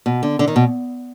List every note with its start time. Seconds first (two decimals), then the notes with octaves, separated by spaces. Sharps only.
0.06 B2
0.23 D3
0.39 D3
0.48 D#3
0.56 B2